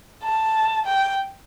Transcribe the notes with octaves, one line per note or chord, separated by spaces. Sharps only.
A5
G5